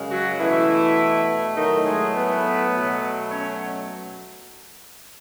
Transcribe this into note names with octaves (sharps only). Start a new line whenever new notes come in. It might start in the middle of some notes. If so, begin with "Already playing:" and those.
Already playing: F#2 C#3 G#3
F#3 F#4
B2 E3 A3 E4
A2 D#3 F#3 A3 D#4
G#3 G#4
B3 B4
B2 F#3 A3
C#4 C#5